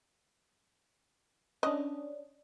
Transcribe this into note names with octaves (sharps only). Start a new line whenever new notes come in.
C#4 D4 D#5